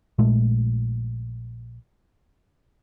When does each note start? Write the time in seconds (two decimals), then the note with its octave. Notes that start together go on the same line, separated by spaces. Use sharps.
0.18 A#1 A#2 G#3 A3